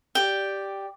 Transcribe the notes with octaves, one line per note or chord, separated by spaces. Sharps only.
G4 D5 G5